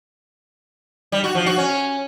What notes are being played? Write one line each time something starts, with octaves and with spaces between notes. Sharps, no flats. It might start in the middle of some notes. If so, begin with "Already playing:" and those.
G3
F#4
F3
F#4
C#4